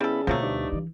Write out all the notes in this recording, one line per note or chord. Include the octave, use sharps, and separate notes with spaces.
C#3 G3 B3 E4 A4 B5
D2 B2 F3 F#3 A3 A#3
G2 D#4 D5
E3